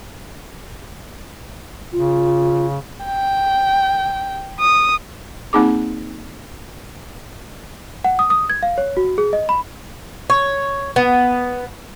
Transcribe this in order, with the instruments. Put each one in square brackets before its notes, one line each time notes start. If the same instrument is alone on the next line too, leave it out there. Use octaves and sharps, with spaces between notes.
[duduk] C#3 [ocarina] F4
[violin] G5
D#6
[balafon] A#3 C4 D#4 G#4 D6
[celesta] F#5
D#6
D#6
G#6
F5
C#5
F#4
G#4
D#5
B5
[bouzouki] C#5
B3